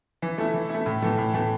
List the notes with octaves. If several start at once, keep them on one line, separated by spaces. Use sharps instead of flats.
E3
A3 E4
E3
A3 E4
A2
E3 A3
A2
E3 A3